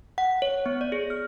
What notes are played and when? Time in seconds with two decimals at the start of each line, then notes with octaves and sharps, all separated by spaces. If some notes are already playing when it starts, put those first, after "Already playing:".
0.18 F#5
0.42 C#5
0.66 B3
0.81 D5
0.92 G#4
1.10 F6